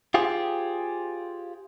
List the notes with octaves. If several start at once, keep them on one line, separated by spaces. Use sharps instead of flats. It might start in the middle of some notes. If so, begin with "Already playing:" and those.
F4 G4 G#4 C5